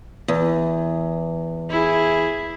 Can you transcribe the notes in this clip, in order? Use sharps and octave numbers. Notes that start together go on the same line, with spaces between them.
E2
E4 G#4